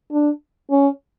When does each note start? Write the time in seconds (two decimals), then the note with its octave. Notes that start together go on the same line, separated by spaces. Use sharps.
0.12 D4
0.71 C#4